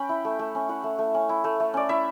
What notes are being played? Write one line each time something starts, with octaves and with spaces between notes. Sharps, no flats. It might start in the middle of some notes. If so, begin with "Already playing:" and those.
Already playing: C#4 G5 B5
E4
A3
A3
C#4
E4 F#5
A3
A3
C#4
E4
A3
A3
C#4 D5
E4 E5